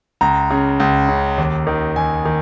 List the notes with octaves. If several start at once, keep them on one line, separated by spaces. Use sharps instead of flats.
C#2 A#5
C#3
C#2
C#3
D#2
D#3
D#2 G#5
D#3